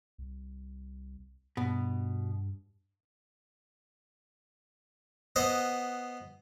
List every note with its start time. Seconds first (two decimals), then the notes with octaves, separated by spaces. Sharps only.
0.18 C2
1.57 G2 B2
5.36 B3 C5 D#5 F#5